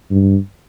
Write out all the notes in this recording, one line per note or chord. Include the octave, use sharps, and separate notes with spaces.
G2